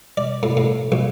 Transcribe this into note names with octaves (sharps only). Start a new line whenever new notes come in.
D5
A2
A2
A#1